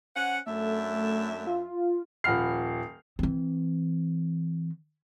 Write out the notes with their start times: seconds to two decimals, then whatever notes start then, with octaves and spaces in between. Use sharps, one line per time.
0.16 C#4 C5 F#5
0.46 F#2 A3 D4 E5
1.47 F4
2.24 D#1 F3 F#5 B5 F6 C7
3.19 E3 C4